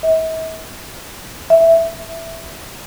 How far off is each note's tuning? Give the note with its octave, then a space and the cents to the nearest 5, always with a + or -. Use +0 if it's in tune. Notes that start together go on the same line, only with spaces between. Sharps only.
E5 -45
E5 +0